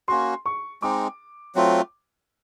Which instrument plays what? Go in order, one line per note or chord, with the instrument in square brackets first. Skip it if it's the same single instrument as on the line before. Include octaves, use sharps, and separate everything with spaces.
[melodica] A#3 C#4 F#4 [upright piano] C6
[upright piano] C#6
[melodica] G#3 C4 D#4 [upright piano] D6
[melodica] F#3 A3 C4 F4